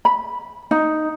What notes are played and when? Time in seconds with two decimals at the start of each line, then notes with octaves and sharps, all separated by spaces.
0.05 B5
0.71 D#4